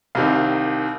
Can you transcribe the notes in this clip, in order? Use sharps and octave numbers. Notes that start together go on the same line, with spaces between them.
C2 C3 D#3 F5